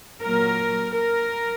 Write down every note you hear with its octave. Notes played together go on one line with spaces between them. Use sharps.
A#2 F#3 A#3 A#4
A#4